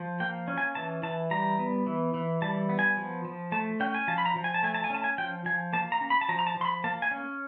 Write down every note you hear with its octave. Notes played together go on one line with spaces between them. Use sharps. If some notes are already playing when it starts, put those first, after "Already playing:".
Already playing: F3
A#3 G5
C#4
G#5
E3 A5
E3 A5
G3 A#5
B3
E3
E3
G3 A5
B3
G#5
F3
F3
A3 A5
C#4 G5
G#5
F3 A5
B5
A#5
F3
G#5
A5
A3 G#5
A5
G#5
C#4 A5
G#5
F3 G5
F3 G#5
A#3 A5
A#5
C#4
B5
A5
F3 A#5
A#5
A5
F3 C6
B5
A#3 A5
G#5
C#4